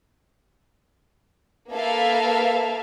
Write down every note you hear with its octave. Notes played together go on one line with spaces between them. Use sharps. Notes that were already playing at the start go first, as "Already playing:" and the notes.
A#3 A4 B4 E5 F5